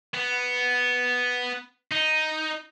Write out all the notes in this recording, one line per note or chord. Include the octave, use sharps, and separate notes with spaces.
B3
D#4